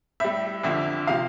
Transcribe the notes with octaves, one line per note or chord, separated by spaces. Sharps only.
A2 G3 E5
F2 D3 F3 E5
C3 F3 F5